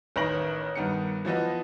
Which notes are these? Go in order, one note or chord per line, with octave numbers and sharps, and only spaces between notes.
A1 D#3 B4 C#6 A#6 F#7
G2 D#3 B3 C#7
E3 F3 B3 D#5